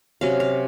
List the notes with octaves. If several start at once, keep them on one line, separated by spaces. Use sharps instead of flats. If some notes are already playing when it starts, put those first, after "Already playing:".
C3 F#3 C#4 F5
F5